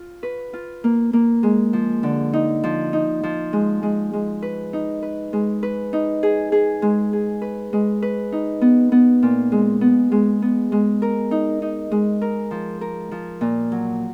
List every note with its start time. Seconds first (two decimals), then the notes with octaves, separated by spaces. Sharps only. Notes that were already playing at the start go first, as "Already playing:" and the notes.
Already playing: F4
0.23 B4
0.53 F4
0.84 A#3
1.13 A#3
1.43 G#3
1.73 F3
2.03 D3
2.33 D#4
2.64 F3
2.93 D#4
3.23 F3
3.53 G#3
3.83 G#3
4.13 G#3
4.42 B4
4.73 D#4
5.03 B4
5.33 G#3
5.63 B4
5.93 D#4
6.23 G#4
6.52 G#4
6.82 G#3
7.13 G#4
7.42 B4
7.73 G#3
8.02 B4
8.32 D#4
8.61 B3
8.92 B3
9.23 A#2
9.52 G#3
9.81 B3
10.12 G#3
10.42 B3
10.72 G#3
11.02 A#4
11.31 D#4
11.62 D#4
11.91 G#3
12.22 A#4
12.51 F3
12.81 A#4
13.11 F3
13.41 A#2
13.72 F#3